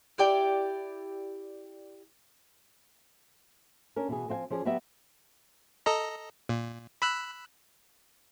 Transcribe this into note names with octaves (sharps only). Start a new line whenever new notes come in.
E4 G4 D5 G5
C#4 D4 A#4
B2 E3 B3 G#4
F3 C4 F5 G5 G#5
F3 C#4 G#4 D5
F#3 B3 F#4 G4 E5
A4 D#5 A#5
A#2
B5 E6 F#6